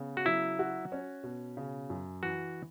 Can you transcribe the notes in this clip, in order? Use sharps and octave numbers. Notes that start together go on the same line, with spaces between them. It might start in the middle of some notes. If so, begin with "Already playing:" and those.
Already playing: C#3 B3
F#4
F#3 E4
F#4
C#4
B2
C#3
F#2
E3 F#4